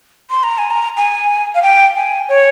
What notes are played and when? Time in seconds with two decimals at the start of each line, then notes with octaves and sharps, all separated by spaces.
0.30 C6
0.43 A#5
0.58 G#5
0.71 A#5
0.97 G#5
1.55 F5
1.62 G5
1.96 G#5
2.29 C#5